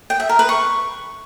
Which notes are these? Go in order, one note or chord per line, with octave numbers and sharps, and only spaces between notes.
G5
E5
A#4
B4
C#6